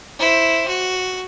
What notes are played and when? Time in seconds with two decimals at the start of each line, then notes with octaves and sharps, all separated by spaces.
0.19 E4 C5
0.67 F#4